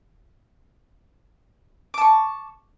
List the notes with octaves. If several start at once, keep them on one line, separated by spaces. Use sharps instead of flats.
A5 C#6 D6